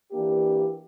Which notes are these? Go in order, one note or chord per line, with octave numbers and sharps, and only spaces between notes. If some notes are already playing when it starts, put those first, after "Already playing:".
E3 A#3 D4 G4